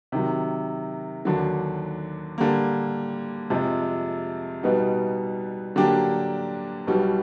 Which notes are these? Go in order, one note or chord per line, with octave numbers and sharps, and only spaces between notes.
C3 D#3 F#3
D#2 D3 F#3
D3 G3 A#3
F2 C3 F3 G#3
B2 G3 B3 D#4
D3 F#3 A#3 D4 G4
B1 B2 G3